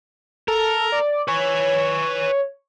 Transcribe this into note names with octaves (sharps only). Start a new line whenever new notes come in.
A4 A#4
D5
B4 C#5 G#5